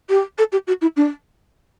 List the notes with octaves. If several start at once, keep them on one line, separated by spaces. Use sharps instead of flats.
G4
A4
G4
F#4
E4
D4